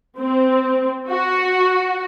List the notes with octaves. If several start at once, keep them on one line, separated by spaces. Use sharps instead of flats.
C4
F#4